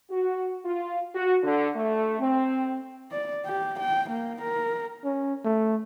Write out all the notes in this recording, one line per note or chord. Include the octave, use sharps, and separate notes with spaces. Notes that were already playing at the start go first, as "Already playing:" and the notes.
F#4
F4
F#4
D3
A3
C4
D5
G4
G5
A#3
A#4
C#4
A3